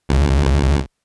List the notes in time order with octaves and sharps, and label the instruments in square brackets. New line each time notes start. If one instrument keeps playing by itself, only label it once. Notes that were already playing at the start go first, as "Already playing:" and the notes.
[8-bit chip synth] C#2